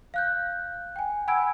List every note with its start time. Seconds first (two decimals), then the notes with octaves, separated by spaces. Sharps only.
0.14 F5 F#6 G6
0.96 G5 G#5
1.28 F#5 G#5 B5 E6 G#6 D7